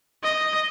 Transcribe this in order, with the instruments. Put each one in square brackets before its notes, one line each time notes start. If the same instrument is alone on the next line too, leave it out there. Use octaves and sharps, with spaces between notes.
[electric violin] D#5